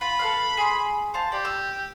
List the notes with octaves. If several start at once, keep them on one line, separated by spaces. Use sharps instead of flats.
F4 B5
A4 B4 F5
G#4 C6
C5 F5 A5
G4 D5
E6